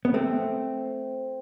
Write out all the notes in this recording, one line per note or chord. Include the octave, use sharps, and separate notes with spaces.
B3
A3 C4